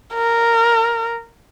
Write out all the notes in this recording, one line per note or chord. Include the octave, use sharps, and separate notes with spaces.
A#4